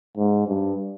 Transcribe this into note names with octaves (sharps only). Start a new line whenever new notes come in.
G#2
G2